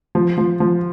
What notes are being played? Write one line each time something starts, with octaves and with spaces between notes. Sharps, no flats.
F3
F3
F3